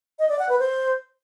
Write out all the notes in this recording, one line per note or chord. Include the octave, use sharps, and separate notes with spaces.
D#5
D5
F#5
B4
C5